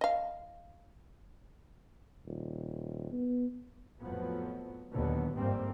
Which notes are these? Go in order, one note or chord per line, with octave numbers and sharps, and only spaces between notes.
D#5 F5
D#1
B3
F2 A2 F3 F#3 B3
D#2 A#2 D3 F#3 B3
G1 F2 G#2 G3 A#3 C4